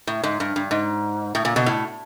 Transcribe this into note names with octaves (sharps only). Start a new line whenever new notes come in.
A2
G#2
G2
G2
G#2
A2
A#2
B2
A2